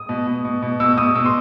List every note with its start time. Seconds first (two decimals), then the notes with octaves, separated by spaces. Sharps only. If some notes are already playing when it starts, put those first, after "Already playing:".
Already playing: D#6
0.09 B2
0.27 B2
0.45 B2
0.62 B2
0.80 B2 E6
0.97 B2 D#6
1.15 B2 E6
1.26 C6